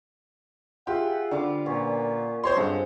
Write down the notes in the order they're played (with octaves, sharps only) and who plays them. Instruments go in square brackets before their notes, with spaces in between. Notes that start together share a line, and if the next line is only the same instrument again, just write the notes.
[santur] F4 [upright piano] G4 [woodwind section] G#4 E5 F#5
[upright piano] D3 [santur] G3 F5 D6
[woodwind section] A#2 [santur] B3 C#4 G4
[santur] C4 G4 D#5 [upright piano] C5 C#5 C6
[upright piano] G2 [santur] G#3 A4 F#5